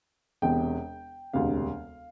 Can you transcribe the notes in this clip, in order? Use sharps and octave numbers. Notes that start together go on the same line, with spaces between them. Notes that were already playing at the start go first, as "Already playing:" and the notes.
E1 E2 C3 G5
E1 D2 C3 F5